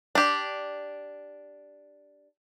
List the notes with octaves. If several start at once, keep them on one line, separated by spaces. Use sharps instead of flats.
D4 G4